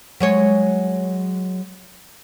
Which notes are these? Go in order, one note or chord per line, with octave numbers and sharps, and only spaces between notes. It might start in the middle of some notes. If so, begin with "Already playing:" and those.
F#3 G#3 C#5